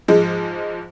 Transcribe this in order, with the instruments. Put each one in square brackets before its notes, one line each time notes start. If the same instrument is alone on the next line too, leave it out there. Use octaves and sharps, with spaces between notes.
[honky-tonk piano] G#2 F3 G#3